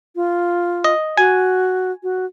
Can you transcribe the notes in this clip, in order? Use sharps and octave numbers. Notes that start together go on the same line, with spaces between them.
F4
D#5
F#4 G#5
F#4